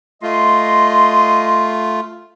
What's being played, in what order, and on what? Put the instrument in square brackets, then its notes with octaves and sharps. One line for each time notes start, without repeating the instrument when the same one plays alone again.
[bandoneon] A3 F4 [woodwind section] D#5 C6